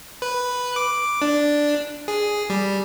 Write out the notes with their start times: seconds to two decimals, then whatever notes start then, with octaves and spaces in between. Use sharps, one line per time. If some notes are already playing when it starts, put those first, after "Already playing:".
0.22 B4
0.76 D6
1.22 D4
2.08 G#4
2.50 G3